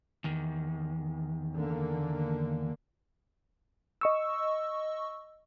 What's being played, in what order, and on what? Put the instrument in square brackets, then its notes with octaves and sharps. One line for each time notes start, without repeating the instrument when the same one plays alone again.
[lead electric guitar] E2 D#3
[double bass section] D3 A#3
[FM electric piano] D#5 C#6 E6